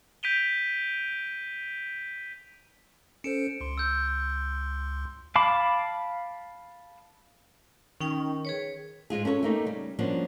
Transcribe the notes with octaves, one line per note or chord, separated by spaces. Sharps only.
G6 B6 D7 D#7 F7 G7
C#4 A4 C5 C#7 D7 E7
C#2 C6
E6 G6
F5 A5 B5 D6
D#3 C#4 D#4 G5
G#4 B4 C#5
G#2 G#3 F4 G#4
C#4 A4 A#4 C#5
A3 A#3 D#4 G4
C#3 G3
F3 G3 A#3 C#4 D4 F#4